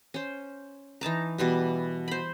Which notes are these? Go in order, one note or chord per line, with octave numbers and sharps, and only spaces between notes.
C#4 C5
E3 D#4 A5 A#5
B2 E3 G3
C5 B5